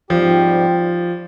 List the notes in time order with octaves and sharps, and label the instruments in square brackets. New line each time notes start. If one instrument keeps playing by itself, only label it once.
[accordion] G#2 G3 C4 G4 [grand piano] F3